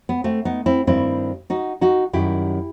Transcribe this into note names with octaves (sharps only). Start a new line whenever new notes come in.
B3
A3 C4
B3 D#4
C4 E4
G2 D#3 G3 C4 E4
D#4 F#4
D#4 F#4
F#2 D#3 G3 E4 G4